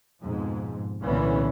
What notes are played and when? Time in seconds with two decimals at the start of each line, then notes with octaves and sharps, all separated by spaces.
0.21 F2 G#2 B2
1.04 C2 A#2 D3 E3 B3 C#4